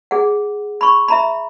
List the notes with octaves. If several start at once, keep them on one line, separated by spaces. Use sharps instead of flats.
G#4 F#5
B5 C#6
E5 A#5 B5